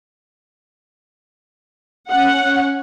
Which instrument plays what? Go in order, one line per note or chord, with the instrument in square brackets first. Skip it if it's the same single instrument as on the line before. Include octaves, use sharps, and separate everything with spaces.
[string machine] C#4 [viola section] F#5